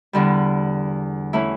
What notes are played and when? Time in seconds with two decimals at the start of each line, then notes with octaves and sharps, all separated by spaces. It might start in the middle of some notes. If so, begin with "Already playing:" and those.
0.13 E2 D3 G3
1.33 E3 A3 C#4 E4